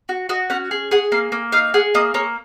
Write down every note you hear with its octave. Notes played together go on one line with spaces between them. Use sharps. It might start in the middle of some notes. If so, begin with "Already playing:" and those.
F#4
F#4 D#5
C#4 F#5
G#4
G#4 F#5
A#3 F5
A#3
D#4 F5
G#4 F#5
A#3 D#5
A#3 C#5